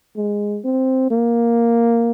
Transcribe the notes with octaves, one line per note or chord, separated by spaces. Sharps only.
G#3
C4
A#3